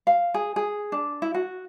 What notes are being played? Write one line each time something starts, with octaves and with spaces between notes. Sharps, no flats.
F5
G#4
G#4
D4
E4
F#4